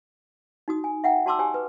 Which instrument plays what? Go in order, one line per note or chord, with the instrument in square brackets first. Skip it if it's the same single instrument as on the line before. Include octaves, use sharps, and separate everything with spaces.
[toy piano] D#4 F#4 D#6
G#5
E5 F#5 G5 A#5
F#4 D5 A5 C6 D6 E6
G4 C#5 G#5
B4